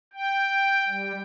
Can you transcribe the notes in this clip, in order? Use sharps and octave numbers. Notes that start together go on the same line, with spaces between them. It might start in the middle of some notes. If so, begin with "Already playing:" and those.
G5
G3